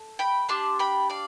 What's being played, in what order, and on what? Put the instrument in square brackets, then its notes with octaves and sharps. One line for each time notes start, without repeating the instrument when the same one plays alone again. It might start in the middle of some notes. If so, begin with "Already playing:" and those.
Already playing: [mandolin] A4
G5 B5
D4 G4 A5 C6
G5 B5
D5 F5